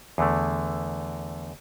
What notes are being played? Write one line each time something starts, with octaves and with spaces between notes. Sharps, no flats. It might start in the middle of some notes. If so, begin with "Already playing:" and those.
E2 D3 A3